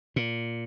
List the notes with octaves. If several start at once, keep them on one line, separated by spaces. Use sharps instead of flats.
A#2